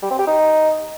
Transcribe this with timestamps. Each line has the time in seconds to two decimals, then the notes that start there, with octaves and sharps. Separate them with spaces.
0.02 G3
0.11 C4
0.19 G4
0.27 D#4